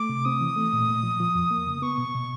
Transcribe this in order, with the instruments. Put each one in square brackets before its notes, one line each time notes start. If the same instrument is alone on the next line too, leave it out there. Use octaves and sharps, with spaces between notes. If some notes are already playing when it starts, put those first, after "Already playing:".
Already playing: [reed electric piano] A3 [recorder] D6
[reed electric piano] C3
[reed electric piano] C4 [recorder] D#6
[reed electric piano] E3
A3
A#2
A#2
F3
F3
F2
A#3
C#3
[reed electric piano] B3 [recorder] C#6
[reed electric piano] B2
B2